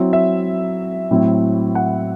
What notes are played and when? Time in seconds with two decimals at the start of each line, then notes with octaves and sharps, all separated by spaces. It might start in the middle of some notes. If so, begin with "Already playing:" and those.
Already playing: F#3 C4 E4
0.13 E5
1.11 A2 F#3 C4 E4
1.75 F#5